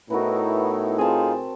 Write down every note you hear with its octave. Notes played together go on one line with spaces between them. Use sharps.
A2 B3 D#4 E4 F#4 A#4 B4
C4 D#4 F4 G#4 A5